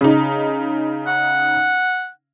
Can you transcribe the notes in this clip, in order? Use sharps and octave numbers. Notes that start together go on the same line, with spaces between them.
C#3 D#4
F#5